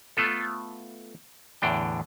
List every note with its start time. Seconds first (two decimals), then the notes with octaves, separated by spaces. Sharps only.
0.17 A3 B3 F4 A4
1.62 E2 A2 D3 D4 G5